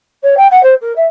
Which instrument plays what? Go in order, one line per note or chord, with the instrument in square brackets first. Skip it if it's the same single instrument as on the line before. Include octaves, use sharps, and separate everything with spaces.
[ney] C#5
G5
F#5
C5
A#4
E5